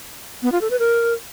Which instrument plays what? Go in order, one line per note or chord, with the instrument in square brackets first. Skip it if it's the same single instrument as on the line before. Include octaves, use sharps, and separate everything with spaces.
[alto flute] B3
F4
A4
B4
A#4